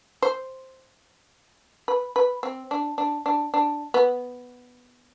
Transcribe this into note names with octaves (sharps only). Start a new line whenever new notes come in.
C5
B4
B4
C4
D4
D4
D4
D4
B3